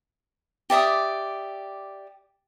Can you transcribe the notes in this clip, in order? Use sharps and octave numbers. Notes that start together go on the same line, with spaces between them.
G4 D5 E5 D#6